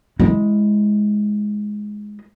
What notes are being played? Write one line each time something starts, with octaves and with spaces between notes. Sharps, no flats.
G#3 E4